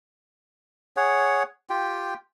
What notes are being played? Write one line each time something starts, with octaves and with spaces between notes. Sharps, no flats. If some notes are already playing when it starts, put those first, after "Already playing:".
G#4 C#5 F#5
F4 G4 G5